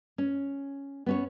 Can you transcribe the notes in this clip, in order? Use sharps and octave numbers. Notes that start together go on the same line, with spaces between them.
C#4
B3 C#4 C#5